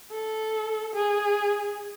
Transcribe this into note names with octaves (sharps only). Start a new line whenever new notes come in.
A4
G#4